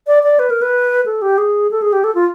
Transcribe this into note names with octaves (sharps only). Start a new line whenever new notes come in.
D5
D5
B4
A#4
B4
A4
G4
G#4
A4
G#4
G4
A4
F4